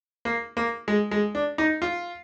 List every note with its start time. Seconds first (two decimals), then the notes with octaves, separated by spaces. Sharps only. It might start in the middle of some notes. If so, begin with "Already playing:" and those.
0.25 A#3
0.57 A#3
0.88 G#3
1.11 G#3
1.35 D4
1.58 D#4
1.82 F4